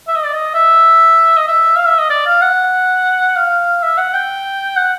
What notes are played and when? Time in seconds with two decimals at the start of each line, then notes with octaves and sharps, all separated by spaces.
0.08 E5
0.16 D#5
0.25 D5
0.34 D#5
0.54 E5
1.37 D#5
1.48 E5
1.76 F5
1.87 E5
1.99 D#5
2.10 D5
2.26 F5
2.42 F#5
3.36 F5
3.83 E5
3.98 F#5
4.14 G5
4.76 F#5